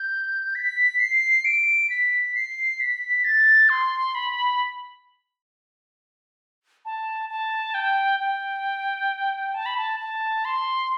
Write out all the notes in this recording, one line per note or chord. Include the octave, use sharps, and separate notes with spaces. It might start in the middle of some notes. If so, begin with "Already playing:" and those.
Already playing: G6
B6
C7
D7
B6
C7
B6
A6
C6
B5
A5
A5
G5
G5
A5
B5
A5
A5
C6